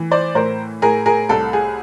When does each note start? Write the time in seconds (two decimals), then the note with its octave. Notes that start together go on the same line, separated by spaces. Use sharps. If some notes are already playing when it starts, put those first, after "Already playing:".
Already playing: A2 E3
0.11 C5 D5
0.35 A2 A#4 C5
0.82 A2 G#4 A#4
1.06 G#4 A#4
1.29 C2 A4
1.53 G#4